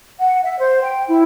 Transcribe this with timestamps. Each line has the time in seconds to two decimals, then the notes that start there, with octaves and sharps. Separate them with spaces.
0.19 F#5
0.42 E5
0.59 C5
0.83 G5
1.08 E4